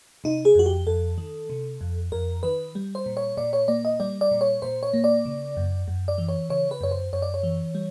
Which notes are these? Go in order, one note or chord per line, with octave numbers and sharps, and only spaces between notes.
C3 D#4
G#4
F2 F#4
G4
F2 A4
D#3
C3
F2
F2 A#4
D#3 B4
G3
C5
A#2
C#5
A#2 D5
C#5
A#3 D5
D#5
G3 D5
D5
A#2
C#5
A#2 C5
C#5
A#3
D5
C#3
F#2
F#2
D5
E3
C#5
C#3 C#5
B4
F#2 C#5
C5
F#2 C#5
D5
C#5
E3
G3